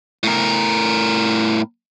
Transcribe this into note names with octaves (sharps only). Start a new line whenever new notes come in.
A2 A#4